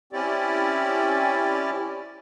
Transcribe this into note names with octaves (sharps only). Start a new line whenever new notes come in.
C4 C#4 E4 G4 D5